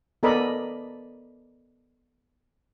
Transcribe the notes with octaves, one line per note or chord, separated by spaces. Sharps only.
B3 A4 A#4 D5 D#5 B5